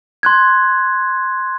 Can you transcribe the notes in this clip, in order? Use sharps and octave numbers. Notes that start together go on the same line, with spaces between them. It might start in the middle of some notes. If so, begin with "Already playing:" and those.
C6 F#6 G#6